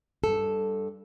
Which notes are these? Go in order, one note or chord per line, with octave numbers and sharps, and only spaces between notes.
G2 A4